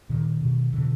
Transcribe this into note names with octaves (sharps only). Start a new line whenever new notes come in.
A#2 D#3
B2
B2 D3 E3